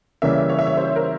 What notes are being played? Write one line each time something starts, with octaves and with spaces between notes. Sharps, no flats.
C#3 E3 G3 A#3 C#4 E5
C#5
E5
C#5
C5
A#4